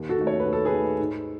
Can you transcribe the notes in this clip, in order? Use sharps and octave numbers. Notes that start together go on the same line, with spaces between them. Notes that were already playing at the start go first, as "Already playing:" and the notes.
Already playing: D#2
F#4 A4
D#3 A3
C#5
B4
D#2
A4
G#4 B4
D#3 A3
G#2